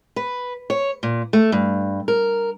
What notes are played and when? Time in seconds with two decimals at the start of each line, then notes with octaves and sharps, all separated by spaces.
0.16 B4
0.70 C#5
1.03 A#2
1.33 A3
1.52 G2
2.08 A#4